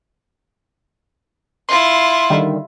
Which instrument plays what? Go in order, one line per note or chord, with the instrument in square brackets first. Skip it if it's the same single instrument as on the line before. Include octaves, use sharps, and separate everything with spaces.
[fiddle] E4 F4 [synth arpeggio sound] C6
[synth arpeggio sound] D3 D#3 G3